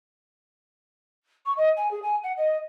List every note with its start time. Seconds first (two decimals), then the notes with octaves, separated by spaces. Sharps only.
1.45 C#6
1.57 D#5
1.77 G#5
1.91 G#4
2.02 G#5
2.23 F#5
2.37 D#5